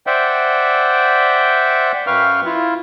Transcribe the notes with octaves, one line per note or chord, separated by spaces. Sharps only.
C5 D5 E5 F#5 G5
F#2 B4 F5 G5 C#6 F6
E4 F4